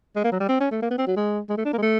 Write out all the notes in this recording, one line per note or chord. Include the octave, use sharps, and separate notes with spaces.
G#3
A#3
F#3
G3
C4
C#4
A3
A#3
B3
C4
F#3
G#3
G#3
A3
D4
A#3
G#3
A3